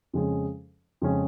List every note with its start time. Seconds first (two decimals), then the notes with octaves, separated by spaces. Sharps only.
0.13 F2 C#3 G#3 C#4 G#4
1.02 F2 C#3 G#3 C#4 G#4